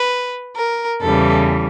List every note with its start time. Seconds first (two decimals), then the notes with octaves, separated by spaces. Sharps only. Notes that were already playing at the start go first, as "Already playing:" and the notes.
Already playing: B4
0.57 A#4
1.01 E2 C#3 E3 G3 A4